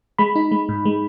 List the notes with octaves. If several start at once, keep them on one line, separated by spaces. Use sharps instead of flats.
G#3 B5
D#4
G#3
G#2
G#3